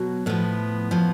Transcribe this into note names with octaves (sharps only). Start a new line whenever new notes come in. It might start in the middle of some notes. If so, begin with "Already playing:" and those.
Already playing: B2 F#3
A2 F3 B3
A2 F3